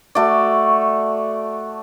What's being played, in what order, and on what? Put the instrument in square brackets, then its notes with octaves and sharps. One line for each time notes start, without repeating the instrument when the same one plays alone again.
[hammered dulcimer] A3 F#4 D5